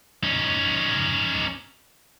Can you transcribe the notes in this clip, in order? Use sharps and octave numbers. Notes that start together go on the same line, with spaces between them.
C#4 D#4